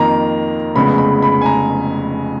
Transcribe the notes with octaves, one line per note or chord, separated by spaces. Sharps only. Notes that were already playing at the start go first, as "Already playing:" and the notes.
Already playing: F2 D#3 A#3 A#5
F1 F2 C#3 G#3 B3 B5
B5
B5
G#5
A#5